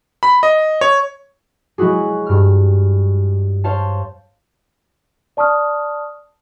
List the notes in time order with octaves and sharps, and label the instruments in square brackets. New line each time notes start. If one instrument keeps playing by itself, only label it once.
[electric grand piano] B5
D#5
C#5
[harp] F#3 G#3 E4 F#4 G#4
G2 F6
C5 C#5 F5 A5
[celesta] D5 A5 C#6 D#6 F6